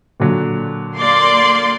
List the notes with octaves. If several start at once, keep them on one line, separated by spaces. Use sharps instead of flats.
A#2 D3 F#3
A#3 D5 C6